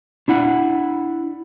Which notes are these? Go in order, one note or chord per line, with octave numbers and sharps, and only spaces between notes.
D4 E4 F#5